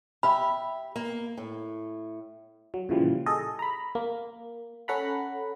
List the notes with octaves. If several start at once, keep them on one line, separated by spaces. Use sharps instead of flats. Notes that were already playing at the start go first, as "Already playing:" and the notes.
G4 E5 B5
A#3
A2
F#3
A#2 C#3 E3 F3 G3
G#4 A4 D#5
A#5 B5
A#3
C#4 A4 F#5 A#5 B5